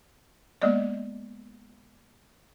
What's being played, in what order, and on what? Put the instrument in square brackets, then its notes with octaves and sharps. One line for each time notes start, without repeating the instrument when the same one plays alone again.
[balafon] G#3 A#3 B3 D5 D#5